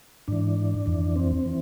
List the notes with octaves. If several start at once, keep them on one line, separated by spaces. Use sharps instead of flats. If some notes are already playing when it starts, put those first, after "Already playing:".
G#2 E3 D4
F2 E3
C4
E3